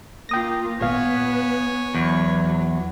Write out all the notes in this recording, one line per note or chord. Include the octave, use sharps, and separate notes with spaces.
A#3 F4 G5 D#6 A#6
G#1 A#2 B3 C#5 F5 G#5
E2 F#3